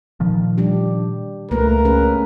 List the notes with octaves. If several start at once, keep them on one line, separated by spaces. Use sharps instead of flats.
A#2 D#3 F3
G3 D4 G4
C#2 A3 A#3 A#4 B4
C#4 G#4 B4